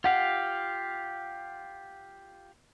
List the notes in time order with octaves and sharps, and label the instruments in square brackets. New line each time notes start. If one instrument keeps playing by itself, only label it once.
[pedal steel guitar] F4 G4 F5 [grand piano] F#5